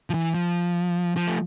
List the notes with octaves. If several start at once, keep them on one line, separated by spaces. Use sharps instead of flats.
F3
E3
F3
F3
A3